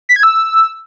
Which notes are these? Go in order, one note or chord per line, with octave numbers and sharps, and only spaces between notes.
B6
G#6
E6